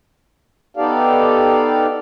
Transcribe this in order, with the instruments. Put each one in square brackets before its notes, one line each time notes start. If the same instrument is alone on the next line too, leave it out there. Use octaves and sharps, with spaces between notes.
[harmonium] B3 D#4 G4 A4 D5 F5